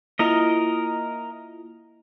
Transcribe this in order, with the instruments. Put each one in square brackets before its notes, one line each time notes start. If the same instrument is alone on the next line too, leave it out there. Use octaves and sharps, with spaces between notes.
[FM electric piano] A#3 E4 F4 [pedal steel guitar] A#4 D#5